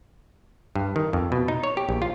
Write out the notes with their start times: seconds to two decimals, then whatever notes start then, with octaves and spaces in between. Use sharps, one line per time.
0.76 G2
0.96 D#3
1.13 F2
1.32 B2
1.48 D#4
1.64 C#5
1.77 G4
1.89 A#1
2.02 F4